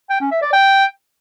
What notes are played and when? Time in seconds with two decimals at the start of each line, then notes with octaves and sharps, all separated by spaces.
0.10 G5
0.21 C#4
0.31 E5
0.42 D5
0.53 G5